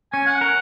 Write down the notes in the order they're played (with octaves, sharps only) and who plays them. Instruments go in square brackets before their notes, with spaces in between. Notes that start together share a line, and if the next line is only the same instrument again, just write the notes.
[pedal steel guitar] C#4 [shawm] G#5
[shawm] F#5
[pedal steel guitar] A#4